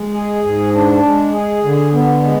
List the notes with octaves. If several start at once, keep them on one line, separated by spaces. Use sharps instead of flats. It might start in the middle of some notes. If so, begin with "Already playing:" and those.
Already playing: G#3
G#4
G#2
D4
G#3
G#4
D3
B3
G#3